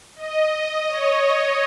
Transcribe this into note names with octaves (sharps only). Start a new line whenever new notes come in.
D#5
C#5